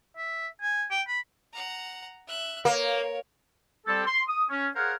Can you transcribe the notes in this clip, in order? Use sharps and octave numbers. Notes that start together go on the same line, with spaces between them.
E5
G#5
G5
B5
F#5 A#5
E5 F#6
A#3 C#5
G3 C4 G4 A4
C6
D#6
C#4
G#4 A#4 C5 C#5 F5 F#5